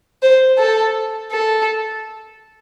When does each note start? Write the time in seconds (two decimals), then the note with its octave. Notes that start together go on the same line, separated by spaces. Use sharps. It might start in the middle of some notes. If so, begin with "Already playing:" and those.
0.22 C5
0.58 A4
1.32 A4